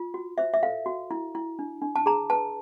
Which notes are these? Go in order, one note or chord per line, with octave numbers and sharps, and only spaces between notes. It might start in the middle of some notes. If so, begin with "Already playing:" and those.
Already playing: F4
F#4
C5 E5
E5
A4 F5
F#4
E4
E4
D4
D4
A5
G#4 A#5
B4 A5